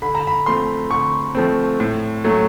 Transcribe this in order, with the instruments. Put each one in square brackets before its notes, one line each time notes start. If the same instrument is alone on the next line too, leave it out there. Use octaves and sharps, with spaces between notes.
[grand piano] D3 B5
A#5
B5
F3 A3 C4 C6
D3 C#6
F3 A3 C4
A2
F#3 A3 C#4